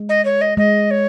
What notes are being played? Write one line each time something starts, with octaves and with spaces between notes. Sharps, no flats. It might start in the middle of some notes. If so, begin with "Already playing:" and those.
Already playing: G#3
D#5
C#5
D#5
G#3 D#5
C#5